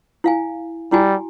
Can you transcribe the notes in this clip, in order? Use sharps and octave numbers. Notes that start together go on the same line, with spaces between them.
E4 F5 G#5
G3 E4 F#4 G#5